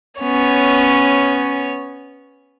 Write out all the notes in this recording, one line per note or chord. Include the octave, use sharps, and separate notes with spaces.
B3 C#4 C#5